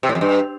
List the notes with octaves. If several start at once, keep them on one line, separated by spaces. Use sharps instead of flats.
C3
A2
F2
G2